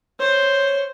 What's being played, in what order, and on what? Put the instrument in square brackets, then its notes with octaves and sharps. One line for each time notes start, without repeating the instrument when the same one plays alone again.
[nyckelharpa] C5 [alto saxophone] C#5